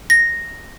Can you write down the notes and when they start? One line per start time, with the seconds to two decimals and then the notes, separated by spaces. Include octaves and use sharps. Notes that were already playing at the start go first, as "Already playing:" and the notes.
0.10 A#6